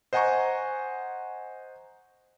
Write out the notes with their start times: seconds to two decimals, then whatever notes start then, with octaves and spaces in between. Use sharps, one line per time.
0.13 C5 D#5 F#5 G#5 A#5 C#6